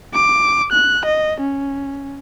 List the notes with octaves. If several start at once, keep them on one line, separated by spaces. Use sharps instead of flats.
D6
F#6
D#5
C#4